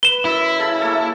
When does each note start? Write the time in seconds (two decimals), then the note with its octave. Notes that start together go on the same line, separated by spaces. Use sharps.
0.03 B4 E7 G7
0.25 F#2 E4
0.59 C#3 A4
0.81 A3 A#3 A4